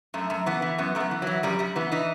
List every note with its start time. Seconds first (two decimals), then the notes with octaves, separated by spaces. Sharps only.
0.14 F#2 A3
0.30 F#2
0.46 E3 B3
0.62 E3
0.78 F#2 B3
0.95 F#2 A3
1.00 B3
1.11 E3
1.22 E3 F#3
1.43 F#2 G3
1.59 F#2 G3
1.76 E3 B3
1.92 E3 D#4